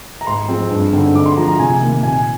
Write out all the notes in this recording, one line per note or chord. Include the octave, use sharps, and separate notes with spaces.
A#5
G#2 C6
F3 G#3 C4
G2
D3 G#3 C4 D#4
D3 D6
C6
F3 G#3 A#5
A#5
C3 G#5
D#3 A#3
A#2 G#5